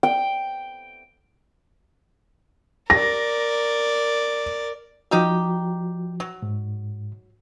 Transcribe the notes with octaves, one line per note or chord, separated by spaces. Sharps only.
G5
A#4 D5 A#6
F3 G3 D#4 F#4 G4
F#3
G#2